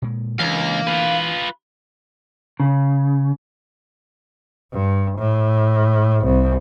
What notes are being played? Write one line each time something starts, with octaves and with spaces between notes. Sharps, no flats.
A#2 G#3
C#2 E3 D4 F5 A#5
F4 B4
C#3
G2
A2
C2